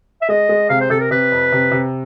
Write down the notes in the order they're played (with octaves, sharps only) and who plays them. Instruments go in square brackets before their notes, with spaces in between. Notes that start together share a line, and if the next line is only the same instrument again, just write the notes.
[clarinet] E5
[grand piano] G#3 [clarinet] D#5
[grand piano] G#3
[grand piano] C3 [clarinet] F5
[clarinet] C5
[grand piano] C3 [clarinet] A4
[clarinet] A#4
[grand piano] C3 [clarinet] B4
[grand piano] F2
C3
C3